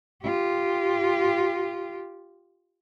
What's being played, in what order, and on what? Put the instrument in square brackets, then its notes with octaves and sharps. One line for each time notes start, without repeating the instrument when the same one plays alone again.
[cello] F4 G4